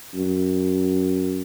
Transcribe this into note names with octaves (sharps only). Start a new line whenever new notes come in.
F#2